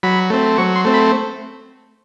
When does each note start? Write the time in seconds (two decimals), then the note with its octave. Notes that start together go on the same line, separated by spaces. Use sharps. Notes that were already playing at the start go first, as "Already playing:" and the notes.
0.03 F#3 B5
0.30 A3 C4
0.58 F#3 C#6
0.76 C6
0.85 A3 C4
0.94 B5